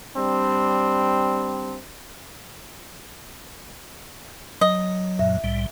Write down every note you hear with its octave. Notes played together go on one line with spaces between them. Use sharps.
G3 C4 D4
F#3 D#5
F#2 A#2 E5
C2 A2 G3